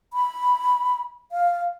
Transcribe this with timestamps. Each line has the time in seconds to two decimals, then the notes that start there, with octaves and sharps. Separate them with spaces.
0.13 B5
1.32 F5